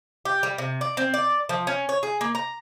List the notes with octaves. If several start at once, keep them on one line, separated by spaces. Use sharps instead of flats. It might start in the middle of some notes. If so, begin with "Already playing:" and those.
G4
G3
C3
D5
C4
D5
F3
C#4
C#5
G#4
A#3
A#5